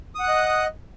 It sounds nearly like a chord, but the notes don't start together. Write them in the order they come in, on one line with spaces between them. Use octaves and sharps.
D#6 F#5 F#6 D#5